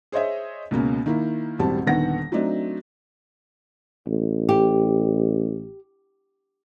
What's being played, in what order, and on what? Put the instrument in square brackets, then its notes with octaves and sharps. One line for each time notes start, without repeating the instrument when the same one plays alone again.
[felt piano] G#4 C5 C#5 D#5 E5
C#2 B2 A#3 C#4
D#3 A#3 E4
E1 A1 G3 C4 F#4 A5
D#1 D3 D#3 B3 F#5 A#6
F#3 A3 C4 D4 D#4
[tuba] A1
[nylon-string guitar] G4